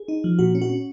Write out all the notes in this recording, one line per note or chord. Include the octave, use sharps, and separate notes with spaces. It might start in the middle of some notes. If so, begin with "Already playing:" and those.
Already playing: G#4
D#4
F3
A#2 F#4
C#4
F#4
C#4